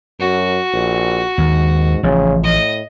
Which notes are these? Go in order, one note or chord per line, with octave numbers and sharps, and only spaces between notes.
F#2 F#4
A#1
D#2 G#2
A1 C#3 F3
A2 D#5